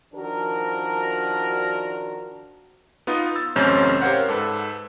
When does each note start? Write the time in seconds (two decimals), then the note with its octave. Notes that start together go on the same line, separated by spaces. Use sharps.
0.14 D#3 F3 D4 F#4 A#4
3.07 B3 D#4 F4 D#5
3.36 E6 A6
3.56 A1 F#2 C#3 C4 C#4 G6
4.01 G4 A#4 C5 C#5 F5 F#5
4.28 G#2 A4 B4